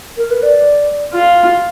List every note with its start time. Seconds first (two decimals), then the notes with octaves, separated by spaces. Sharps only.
0.17 A#4
0.31 B4
0.43 D5
1.13 F4